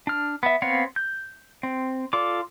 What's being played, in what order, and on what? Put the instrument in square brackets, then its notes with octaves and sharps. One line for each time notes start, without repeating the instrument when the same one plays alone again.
[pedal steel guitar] D4 F6
B3 E5
B3 C4 C#5 F5 F#5
G6
C4
F4 A4 D5 D6